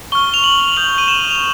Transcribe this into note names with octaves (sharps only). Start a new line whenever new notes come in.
C#6 F6 G7
F7
F#7
D#6 G6 F#7
D#7
E7
F7